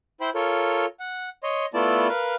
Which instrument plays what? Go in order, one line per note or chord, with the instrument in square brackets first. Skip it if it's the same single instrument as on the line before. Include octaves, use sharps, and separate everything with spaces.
[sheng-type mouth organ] E4 C5 G5 B5
F4 A4 A#4 C#5
F#5
C#5 D#5 C6
A3 B3 E4 F4 D5 A5
A#4 B4 F5